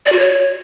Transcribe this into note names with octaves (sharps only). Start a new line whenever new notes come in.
D5
F#4
C#5